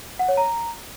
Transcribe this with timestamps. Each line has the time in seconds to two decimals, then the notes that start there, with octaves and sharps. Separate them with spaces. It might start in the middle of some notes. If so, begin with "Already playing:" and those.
0.19 F#5
0.28 C#5
0.37 A#5